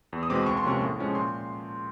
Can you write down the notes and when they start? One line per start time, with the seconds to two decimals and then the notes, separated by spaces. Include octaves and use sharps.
0.13 E2
0.23 D#6
0.30 B2 G#3 C4 D6
0.46 C#2 C#6
0.57 C6
0.64 C3 F3 A#3 C#4 C#6
0.82 A2
0.99 F3 G#3 C#4
1.15 A#2 C6